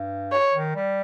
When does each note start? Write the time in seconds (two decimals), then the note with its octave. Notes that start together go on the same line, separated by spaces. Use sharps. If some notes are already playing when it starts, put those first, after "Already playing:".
Already playing: G2
0.32 C#5
0.54 D#3
0.75 G3